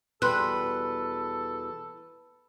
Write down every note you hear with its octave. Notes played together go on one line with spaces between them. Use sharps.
E2 B2 G3 A4 B4 C6 F#6